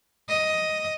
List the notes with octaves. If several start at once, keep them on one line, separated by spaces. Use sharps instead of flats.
D#5